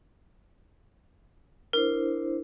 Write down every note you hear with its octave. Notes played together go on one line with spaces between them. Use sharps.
D4 E4 A#4 C5